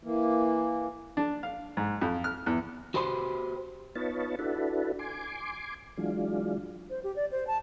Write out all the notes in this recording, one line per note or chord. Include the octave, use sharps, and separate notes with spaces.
E3 A#3
D4
F5
G#2
F2
F6
E2
F#4 G4 B4 C5 A#5 C6
B3 D#4 F4 B4 C#5 A5
D4 E4 F#4 A4 B4
G#5 C6 D6
E3 F#3 G#3 D4 F4
C5
G4
D5
C5
A5